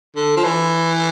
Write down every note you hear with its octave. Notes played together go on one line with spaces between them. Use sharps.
D3
F3
E3